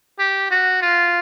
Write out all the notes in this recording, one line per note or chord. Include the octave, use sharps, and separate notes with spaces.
G4
F#4
F4